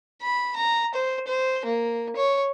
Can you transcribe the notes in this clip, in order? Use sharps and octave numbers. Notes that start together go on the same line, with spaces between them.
B5
A#5
C5
C5
A#3
C#5